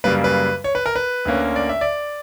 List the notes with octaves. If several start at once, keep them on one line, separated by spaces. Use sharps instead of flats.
F#2 C#3 G3 A#3 B4
B4
C#5
B4
A#4
B4
D2 D3 A#3 C#4
D5
E5
D5